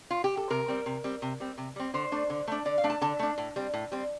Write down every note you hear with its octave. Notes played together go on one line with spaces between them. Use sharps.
F4
G4
A4
C3 A#4
G3 C4
C3
G3 C4
C3
G3 C4
C3
G3 C4
D3 C5
A3 D4
D3
A3 D4
D3 D5
F5
A3 D4
A5
D3 A5
A3 D4
A2
G3 C4
A2
G3 C4